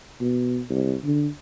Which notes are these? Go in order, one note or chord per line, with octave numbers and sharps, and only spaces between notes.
B2
C2
D3